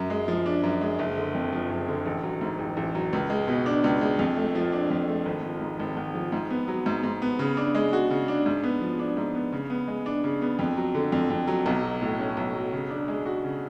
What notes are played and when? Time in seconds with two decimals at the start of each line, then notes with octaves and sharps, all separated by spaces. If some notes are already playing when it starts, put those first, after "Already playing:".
Already playing: F#2
0.10 G#3
0.28 F3
0.46 D4
0.63 F#2
0.81 G#3
0.99 F#1
1.17 D3
1.35 F2
1.53 F3
1.70 F#1
1.88 D3
2.06 A1
2.23 F#3
2.41 G#2
2.59 A1
2.77 A1
2.95 F#3
3.13 C#2
3.30 G#3
3.48 B2
3.66 D4
3.84 C#2
4.01 G#3
4.19 F2
4.37 A3
4.55 F3
4.72 D4
4.90 F2
5.08 A3
5.26 G#1
5.43 F3
5.61 G#2
5.79 G#1
5.97 G#1
6.15 F3
6.32 G#2
6.50 B3
6.68 F#3
6.86 G#2
7.03 G#2
7.22 B3
7.39 C#3
7.57 D4
7.75 G#3
7.93 F#4
8.10 C#3
8.28 D4
8.46 G#2
8.63 B3
8.81 F3
8.99 D4
9.17 G#2
9.35 B3
9.53 C#3
9.70 B3
9.88 G#3
10.06 D4
10.24 C#3
10.42 B3
10.59 F2
10.77 F#3
10.95 D3
11.12 F2
11.30 F2
11.47 F#3
11.66 B1
11.83 F#3
12.02 A2
12.19 C#4
12.37 B1
12.54 F#3
12.72 C#3
12.90 D4
13.08 G#3
13.26 F#4
13.44 C#3